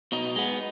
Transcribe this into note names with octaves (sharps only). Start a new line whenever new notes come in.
B2 D#4
G#3 B3